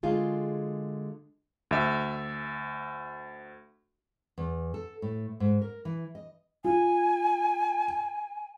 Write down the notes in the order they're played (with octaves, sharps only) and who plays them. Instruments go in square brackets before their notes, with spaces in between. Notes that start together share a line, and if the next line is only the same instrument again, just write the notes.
[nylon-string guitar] D3 G#3 F4 F#4 G#4
[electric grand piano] D2 E5
[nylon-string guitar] E2
A4
A2
G#2
A#4
E3
D#5
[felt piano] F4 [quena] G#5